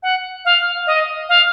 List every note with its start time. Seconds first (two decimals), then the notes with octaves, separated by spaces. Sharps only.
0.03 F#5
0.45 F5
0.87 D#5
1.29 F5